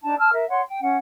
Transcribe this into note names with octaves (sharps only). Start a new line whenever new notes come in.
D4 D#4 A5
A5 E6 F6
A#4 E5
C#5 F#5 C6
G5
C#4 F#5